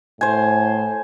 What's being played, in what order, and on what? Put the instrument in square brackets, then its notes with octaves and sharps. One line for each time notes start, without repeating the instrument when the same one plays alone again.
[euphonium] A2 [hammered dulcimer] C5 G#5